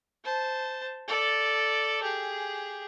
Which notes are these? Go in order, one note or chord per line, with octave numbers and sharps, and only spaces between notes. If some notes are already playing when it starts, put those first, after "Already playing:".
C5 A5
A4 D5
G4 G#4